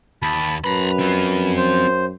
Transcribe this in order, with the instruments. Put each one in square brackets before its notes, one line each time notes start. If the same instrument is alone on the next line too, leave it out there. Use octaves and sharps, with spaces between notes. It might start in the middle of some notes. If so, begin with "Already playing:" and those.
[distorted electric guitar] D#2 [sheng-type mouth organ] A5 B5
[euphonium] F#2 [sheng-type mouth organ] B4 [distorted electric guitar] A#5 B5
[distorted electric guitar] C4 F4
[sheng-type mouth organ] C5